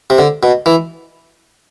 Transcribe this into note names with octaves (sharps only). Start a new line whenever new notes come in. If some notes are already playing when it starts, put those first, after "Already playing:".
C3
D3
B2
E3